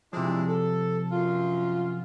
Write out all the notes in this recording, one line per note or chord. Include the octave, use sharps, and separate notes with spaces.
C3 F3 G#3 D4 E4
A4
F#2 F4